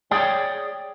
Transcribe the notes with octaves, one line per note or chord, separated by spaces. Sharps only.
G#4 C#5 D5 G5